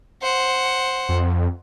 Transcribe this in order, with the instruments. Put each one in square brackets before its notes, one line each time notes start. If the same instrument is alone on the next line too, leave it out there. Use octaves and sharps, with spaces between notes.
[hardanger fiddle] C5 F#5
[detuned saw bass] F2